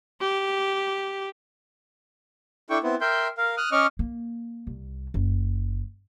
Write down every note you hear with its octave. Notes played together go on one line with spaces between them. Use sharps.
G4
D4 E4 A4 G5 C#6
B3 C4 E4
A#4 E5 G5 C6 G6
A#4 F5
D#6 F6 F#6
C#4 D#5 C#6 D6 F6
A#3
C2
F#1